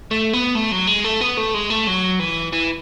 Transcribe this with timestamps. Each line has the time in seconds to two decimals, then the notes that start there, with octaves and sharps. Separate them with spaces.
0.11 A3
0.33 B3
0.55 A3
0.72 F#3
0.87 G#3
1.04 A3
1.21 B3
1.37 A3
1.54 G#3
1.70 A3
1.87 F#3
2.20 E3
2.52 E3